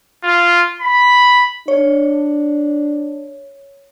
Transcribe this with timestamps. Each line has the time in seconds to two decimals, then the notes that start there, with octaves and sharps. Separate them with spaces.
0.24 F4
0.81 B5
1.68 D4 C#5